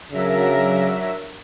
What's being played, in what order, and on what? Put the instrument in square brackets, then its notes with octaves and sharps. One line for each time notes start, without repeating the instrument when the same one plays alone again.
[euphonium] C#3 [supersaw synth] F#3 E5 [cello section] D4 A#4